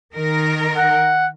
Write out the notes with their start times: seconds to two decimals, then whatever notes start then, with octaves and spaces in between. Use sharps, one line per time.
0.15 D#3 A#4
0.75 F#5